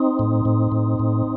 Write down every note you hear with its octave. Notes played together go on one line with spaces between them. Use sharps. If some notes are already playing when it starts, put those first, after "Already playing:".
Already playing: C4 D#4
A2
A2
A2
A2